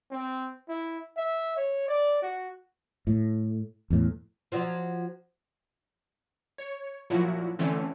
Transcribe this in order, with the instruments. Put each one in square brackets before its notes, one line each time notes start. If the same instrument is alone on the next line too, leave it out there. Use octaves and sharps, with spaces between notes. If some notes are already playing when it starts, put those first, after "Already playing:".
[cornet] C4
E4
E5
C#5
D5
F#4
[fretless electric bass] A2
E2 A2
[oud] F3 F#3
[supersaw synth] C#5
A#2 F3 F#3 E4 F#4
D3 E3 A3 C4 C#4